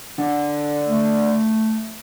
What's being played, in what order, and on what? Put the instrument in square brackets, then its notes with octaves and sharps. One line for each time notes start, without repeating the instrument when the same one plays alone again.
[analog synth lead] D3
[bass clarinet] A3